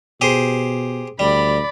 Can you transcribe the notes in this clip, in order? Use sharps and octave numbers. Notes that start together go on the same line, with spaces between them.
B2 G4 G#4 C5
D2 G3 D5 B5